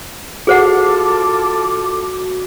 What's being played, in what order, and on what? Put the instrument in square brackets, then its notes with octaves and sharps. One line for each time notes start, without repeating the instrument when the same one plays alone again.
[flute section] F4 A4 D6 [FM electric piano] F#4 [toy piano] G#4 C5 F#5